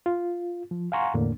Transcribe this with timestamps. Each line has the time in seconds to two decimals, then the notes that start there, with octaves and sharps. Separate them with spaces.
0.06 F4
0.71 F3
0.92 F5 F#5 G#5 A#5 C6 C#6
1.14 E2 A2 D3 A#3 D4